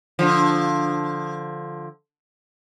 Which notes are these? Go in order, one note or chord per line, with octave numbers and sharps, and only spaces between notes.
D3 F3